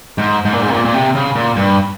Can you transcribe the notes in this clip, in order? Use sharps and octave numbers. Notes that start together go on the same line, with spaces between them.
G#2
G#2
A#2
G#2
C3
A#2
A#2
C3
C#3
A#2
G2